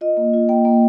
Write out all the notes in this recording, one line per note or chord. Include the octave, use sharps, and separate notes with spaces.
F4 D#5
A#3
F4
A#3 G5
A#3